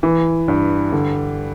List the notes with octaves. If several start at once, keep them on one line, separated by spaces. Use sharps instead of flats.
E3
G2
D3